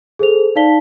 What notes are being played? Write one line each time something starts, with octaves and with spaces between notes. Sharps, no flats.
G#4 A4 C5 F7
D#4 D5 F5 A5 B6 G7